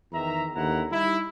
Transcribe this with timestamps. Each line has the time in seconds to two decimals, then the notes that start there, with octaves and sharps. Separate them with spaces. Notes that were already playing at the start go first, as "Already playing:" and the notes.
0.12 E2 D#3 E5 A#5
0.55 D#2 D3 E4 F#5 A#5
0.92 G3 D#4 E4